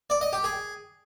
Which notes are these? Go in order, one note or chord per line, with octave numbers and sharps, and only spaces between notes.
D5
D#5
G4
G#4